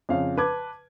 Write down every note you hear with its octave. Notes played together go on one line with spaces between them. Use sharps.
F2 C#3 F5
B4 A5 D6 G#6